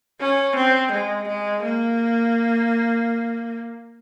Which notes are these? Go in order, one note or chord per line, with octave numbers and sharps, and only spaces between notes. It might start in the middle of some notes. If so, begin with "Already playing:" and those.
C#4
C4
G#3
G#3
A#3